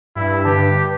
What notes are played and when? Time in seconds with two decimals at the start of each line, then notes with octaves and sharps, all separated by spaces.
0.16 G2 E4
0.45 D3 G4 B4 A5